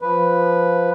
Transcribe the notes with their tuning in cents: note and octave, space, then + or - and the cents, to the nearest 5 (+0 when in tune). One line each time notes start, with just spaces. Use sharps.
F3 +0 B4 +0